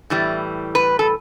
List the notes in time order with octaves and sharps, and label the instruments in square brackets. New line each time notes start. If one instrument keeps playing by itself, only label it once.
[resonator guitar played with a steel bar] A2 E3 G3
B4
A4